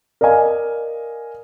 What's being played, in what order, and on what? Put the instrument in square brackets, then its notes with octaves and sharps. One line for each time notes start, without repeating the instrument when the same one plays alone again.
[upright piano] A#4 D5 D#5 F5 G#5